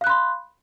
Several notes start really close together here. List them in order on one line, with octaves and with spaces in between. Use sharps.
F5 F#6 B5 C6